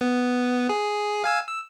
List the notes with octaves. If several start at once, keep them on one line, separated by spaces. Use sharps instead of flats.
B3
G#4
F5 G#5 E6
E6